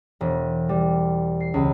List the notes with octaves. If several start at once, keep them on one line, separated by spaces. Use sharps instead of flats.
E1
G3
C7
C#2